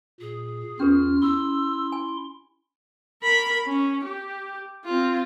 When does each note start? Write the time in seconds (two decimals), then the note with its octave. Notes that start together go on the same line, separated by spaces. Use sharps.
0.20 A#2 G#4
0.80 E2 C#4 F4 G4 A#4 F6
1.22 E4 C6 E6
1.92 G#5
3.22 A#4 B5
3.66 C#4
4.05 G4
4.85 C4 F4